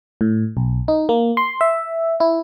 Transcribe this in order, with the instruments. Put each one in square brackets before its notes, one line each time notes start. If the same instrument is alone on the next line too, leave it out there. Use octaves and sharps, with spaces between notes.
[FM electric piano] A2
B1
D#4
A#3
C6
E5
E4